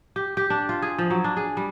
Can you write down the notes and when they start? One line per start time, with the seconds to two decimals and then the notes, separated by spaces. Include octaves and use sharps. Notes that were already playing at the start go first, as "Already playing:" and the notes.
0.16 G4
0.37 G4
0.50 D4
0.69 F4
0.82 G#4
0.98 F3
1.10 F#3
1.24 D4
1.37 G#4
1.57 G3